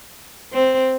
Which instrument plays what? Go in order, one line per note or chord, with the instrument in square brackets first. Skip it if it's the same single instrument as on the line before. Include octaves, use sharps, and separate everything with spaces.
[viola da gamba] C4